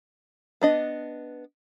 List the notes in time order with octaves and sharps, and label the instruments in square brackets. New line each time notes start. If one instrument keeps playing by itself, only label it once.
[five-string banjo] B3 D4 D#5